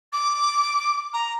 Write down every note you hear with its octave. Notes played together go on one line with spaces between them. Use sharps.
D6
A#5